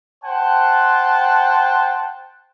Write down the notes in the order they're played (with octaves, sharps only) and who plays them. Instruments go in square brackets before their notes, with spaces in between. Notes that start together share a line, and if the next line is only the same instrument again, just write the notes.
[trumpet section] C5 F#5 G5 A5